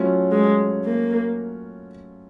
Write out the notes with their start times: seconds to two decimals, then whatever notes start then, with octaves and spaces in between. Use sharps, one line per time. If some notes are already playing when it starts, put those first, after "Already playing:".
Already playing: F#3 A3 C#4 F4
0.31 G#3
0.85 A#3